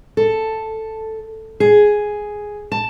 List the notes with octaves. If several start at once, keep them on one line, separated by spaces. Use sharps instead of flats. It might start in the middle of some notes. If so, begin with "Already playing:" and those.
A4
G#4
A5